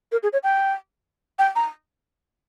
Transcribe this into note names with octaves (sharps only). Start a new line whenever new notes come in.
A#4
G#4
C#5
G5
G5
A#5